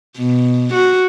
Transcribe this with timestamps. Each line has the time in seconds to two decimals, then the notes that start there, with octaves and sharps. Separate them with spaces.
0.18 B2
0.74 F#4